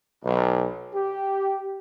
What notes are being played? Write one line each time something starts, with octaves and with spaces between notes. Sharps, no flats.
B1
G4